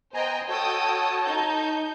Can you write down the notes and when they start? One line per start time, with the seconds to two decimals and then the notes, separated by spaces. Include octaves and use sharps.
0.14 B3 C5 D#5 G5 G#5 A#5
0.49 F#4 A4 C#5 G5 A5 D#6
1.25 D#4 G6